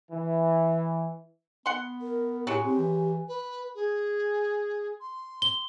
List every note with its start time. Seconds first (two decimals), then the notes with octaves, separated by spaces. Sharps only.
0.12 E3
1.66 B3 F#5 C6
2.02 A#4
2.47 A2 F#3 G#3 G4
2.64 C4 G4
2.78 E3
3.28 B4
3.75 G#4
5.01 C6
5.42 G7